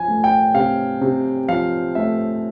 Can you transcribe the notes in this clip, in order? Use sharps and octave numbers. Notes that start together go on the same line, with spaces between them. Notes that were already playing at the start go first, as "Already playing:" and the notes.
Already playing: F3 G#5
A3
G5
C3 F5
C3
F3 F5
A3 E5